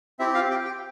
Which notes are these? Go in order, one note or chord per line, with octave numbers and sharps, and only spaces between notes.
C4 E4 G4 E5
F4 F5
G4 G5
G4 G5